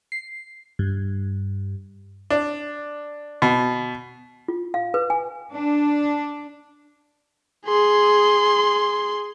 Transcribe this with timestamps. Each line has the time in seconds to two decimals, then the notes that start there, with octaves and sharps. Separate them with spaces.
0.12 C7
0.79 G2
2.30 D4
3.42 B2
4.48 F4
4.74 F5
4.94 B4
5.10 G#5
5.52 D4
7.66 G#4 C6